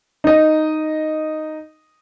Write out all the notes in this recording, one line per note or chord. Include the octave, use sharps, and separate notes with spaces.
D#4 D#5